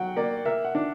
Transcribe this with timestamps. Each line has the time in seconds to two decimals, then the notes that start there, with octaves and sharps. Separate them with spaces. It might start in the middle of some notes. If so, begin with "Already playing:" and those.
Already playing: F#3 F#5 G5
0.16 A#3 D5
0.45 A#4 E5
0.65 F#5
0.75 D4